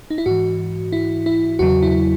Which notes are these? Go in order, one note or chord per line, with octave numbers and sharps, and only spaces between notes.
D#4
E4
G#2 E3 F#4
E4
E4
E2 C#3 F#3 F#4
E4